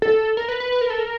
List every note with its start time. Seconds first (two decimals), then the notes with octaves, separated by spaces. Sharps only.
0.02 A4
0.37 A#4
0.48 B4
0.60 B4
0.72 B4
0.81 A#4
0.90 A4
0.98 A#4